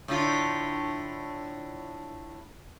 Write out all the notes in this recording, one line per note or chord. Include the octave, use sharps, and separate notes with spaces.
A2 D3 F4